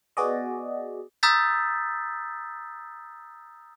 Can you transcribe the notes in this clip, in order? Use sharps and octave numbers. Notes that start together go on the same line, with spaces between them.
B3 F#4 G#4 D5 D#5
A#5 D#6 E6 G6 A6 B6